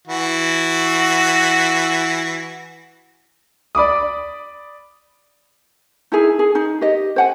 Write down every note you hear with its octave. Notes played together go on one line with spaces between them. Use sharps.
E3 F#4
D5 B5 D6 D#6
D#4 E4 G#4
G#4
D#4
G4 D#5
C5 F#5 G#5